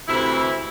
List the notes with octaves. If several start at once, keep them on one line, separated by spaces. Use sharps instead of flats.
D2 C3 E3 C4 E4